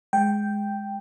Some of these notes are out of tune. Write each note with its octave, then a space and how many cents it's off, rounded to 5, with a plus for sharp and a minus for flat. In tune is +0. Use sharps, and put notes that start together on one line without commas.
G#3 +0 G5 +0